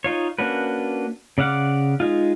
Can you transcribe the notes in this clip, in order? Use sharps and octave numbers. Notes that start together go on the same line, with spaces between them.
D#4 F4 C#5
A#3 C#4 D4 F#4 B4
C#3 D5 F5 F#5 D6
G#3 D#4 F4